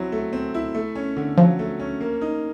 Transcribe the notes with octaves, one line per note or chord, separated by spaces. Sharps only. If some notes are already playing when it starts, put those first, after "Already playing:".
Already playing: F#3 C4 E4
A3
C4
E4
A3
C#4
D3
F3 F#3
A3
C#4
A#3
D#4